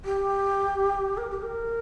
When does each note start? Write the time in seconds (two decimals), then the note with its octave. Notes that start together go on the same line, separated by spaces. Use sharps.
0.05 G4
1.17 A#4
1.31 G4
1.43 A#4